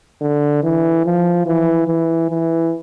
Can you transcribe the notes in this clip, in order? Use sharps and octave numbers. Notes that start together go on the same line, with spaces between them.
D3
E3
F3
E3
E3
E3